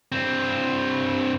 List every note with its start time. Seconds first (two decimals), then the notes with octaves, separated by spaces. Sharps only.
0.12 G2 C4